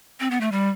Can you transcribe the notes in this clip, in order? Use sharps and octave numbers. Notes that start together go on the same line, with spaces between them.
C4
B3
A3
G3